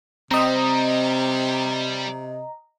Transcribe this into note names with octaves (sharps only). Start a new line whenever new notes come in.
C3 G3 C4 D#5 A#5